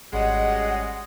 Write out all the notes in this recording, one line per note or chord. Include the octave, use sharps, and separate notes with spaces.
G#1 C#3 G3 G#3 F#4 C#5 D#5 F#5